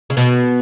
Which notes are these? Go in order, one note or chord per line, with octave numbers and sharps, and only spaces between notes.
C#3
B2